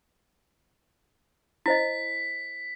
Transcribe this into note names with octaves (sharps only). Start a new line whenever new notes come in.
E4 C5 D#5 B6